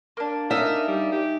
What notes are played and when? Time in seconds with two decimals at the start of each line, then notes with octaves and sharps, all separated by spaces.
0.17 A#3 D4
0.51 D#4 A#4 E5 G#5
0.88 G3
1.12 G4